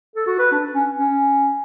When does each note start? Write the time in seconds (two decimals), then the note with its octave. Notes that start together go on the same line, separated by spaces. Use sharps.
0.16 A4
0.27 F#4
0.39 B4
0.52 D4
0.74 C#4
0.99 C#4